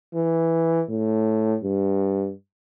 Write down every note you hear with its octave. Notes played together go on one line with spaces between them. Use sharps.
E3
A2
G2